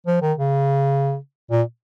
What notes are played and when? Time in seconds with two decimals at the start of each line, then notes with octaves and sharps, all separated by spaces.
0.07 F3
0.22 D#3
0.38 C#3
1.51 A#2